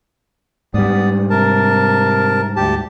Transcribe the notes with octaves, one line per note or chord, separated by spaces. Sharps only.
G#2 G3 B3 D5 D#6
C3 A#4 A5
D2 G4 A5